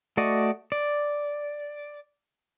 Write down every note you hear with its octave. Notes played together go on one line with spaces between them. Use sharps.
A3 F#4 D5 D#5
D5